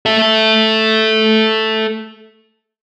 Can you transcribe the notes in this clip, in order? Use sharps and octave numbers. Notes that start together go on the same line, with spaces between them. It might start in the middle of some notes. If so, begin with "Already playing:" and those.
A4 E5